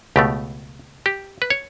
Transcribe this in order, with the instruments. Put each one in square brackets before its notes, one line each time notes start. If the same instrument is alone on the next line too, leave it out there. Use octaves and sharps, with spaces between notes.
[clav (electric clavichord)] C#2 B2 A3 G4
G4
B4
C#5